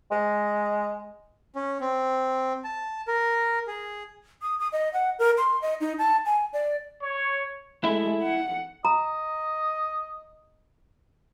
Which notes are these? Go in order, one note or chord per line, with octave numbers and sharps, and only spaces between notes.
G#3
C#4
C4
A5
A#4
G#4
D#6
D#6
D#5
F#5
A#4
C6
D#5
D#4
A5
G#5
D5
C#5
G#3 A3 E4 E5
F#5
D#5 A#5